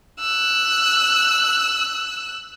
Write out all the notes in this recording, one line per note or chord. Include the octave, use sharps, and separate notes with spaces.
E6 F#6